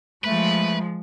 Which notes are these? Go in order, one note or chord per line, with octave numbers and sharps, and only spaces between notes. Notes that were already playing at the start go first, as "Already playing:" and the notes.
F3 G#3 A3 B4